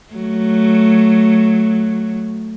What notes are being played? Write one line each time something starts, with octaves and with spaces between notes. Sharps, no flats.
F#3 A3